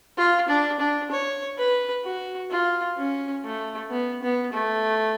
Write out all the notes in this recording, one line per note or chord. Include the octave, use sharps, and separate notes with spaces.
F4
D4
D4
C#5
B4
F#4
F4
C#4
A3
B3
B3
A3